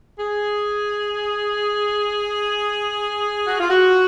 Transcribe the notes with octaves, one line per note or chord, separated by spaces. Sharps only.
G#4
F#4
F4
F#4